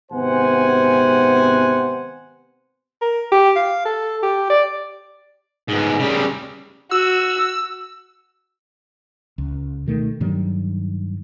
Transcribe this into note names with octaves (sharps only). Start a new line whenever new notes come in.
G#1 C3 B3 C5 F#5 G#5
A#4
G4
F5
A4
G4
D5
G#2 B3
C#3 G3
F#4 E6
C#2
B2 D#3 A3
G2 D#3 F#3 G3